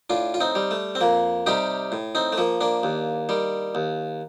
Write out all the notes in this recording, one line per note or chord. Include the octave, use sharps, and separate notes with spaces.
A2 D4 F4
F4
C4 D#4
G3
A3
C4
F2 A#3
C3 G3 D#4 G4
A2
C4 D#4
A3
F3 A#3
A#3 D4
D#2
D#3 G3
D#2